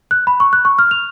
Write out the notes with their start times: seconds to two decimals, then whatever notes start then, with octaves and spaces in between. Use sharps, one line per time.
0.11 F#6
0.27 B5
0.40 C#6
0.53 F#6
0.65 C#6
0.79 F6
0.91 F7